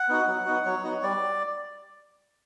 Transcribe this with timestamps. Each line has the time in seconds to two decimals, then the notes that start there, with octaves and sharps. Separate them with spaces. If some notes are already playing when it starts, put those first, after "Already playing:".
Already playing: F#5
0.09 B3 D#4 F#4
0.27 F#3
0.46 B3 D#4 F#4
0.65 F#3 C#5
0.84 B3 D#4 F#4
1.03 G3 D5